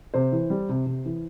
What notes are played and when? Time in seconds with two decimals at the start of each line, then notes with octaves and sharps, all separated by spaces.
0.14 C3 C5
0.32 E3
0.50 G3
0.69 C3
0.86 C3
1.05 E3